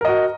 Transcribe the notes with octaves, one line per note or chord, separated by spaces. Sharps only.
F#4 A#4 D#5